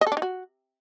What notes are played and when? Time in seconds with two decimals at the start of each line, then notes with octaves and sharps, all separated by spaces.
0.01 D#5
0.07 A4
0.12 D4
0.17 D#4
0.22 F#4